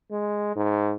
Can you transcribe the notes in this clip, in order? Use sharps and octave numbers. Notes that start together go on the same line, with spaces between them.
G#3
G#2